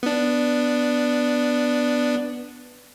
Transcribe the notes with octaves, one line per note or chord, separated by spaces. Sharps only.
B3 D4